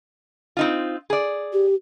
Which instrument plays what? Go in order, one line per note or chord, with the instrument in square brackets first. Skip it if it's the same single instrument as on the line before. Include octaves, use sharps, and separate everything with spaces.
[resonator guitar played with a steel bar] C4 D#4 F4
G#4 D5
[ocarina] G4